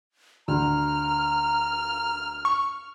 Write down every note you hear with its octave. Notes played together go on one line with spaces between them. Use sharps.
D2 A#5 F6
C#6